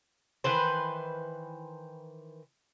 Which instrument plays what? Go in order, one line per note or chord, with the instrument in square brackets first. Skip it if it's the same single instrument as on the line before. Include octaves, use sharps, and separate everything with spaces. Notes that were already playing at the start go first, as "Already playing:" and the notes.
[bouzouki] D#3 E3 B4 C5